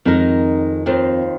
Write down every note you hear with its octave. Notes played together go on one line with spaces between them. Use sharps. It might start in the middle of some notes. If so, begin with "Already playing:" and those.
F2 D#3 G#3 D#4 A#4
D#2 D#3 C4 F4 C5